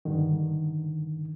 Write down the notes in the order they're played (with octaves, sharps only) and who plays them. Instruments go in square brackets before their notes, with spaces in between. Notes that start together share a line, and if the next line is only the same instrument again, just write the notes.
[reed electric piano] G2 D3 D#3